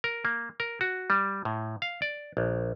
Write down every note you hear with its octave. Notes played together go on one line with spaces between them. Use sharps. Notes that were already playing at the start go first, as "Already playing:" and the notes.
A#4
A#3
A#4
F#4
G3
A2
F5
D5
A#1